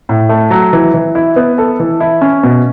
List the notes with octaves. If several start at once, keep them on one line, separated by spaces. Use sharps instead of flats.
A2
A3
F#3
E3
E3
E4
B3
A4
E3
E4
C#4
B2